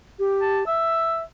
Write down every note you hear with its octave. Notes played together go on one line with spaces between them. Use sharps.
G4
A5
E5 E6